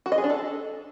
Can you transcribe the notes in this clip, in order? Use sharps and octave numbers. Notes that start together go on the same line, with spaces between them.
F#4
D#5
G#4
D4
A4